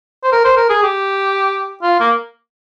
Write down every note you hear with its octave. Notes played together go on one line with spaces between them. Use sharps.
C5
A#4
C5
A#4
G#4
G4
F4
A#3